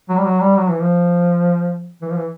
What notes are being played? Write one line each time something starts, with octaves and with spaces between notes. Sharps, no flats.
F#3
G3
F#3
G3
F#3
E3
F3
E3
F3
E3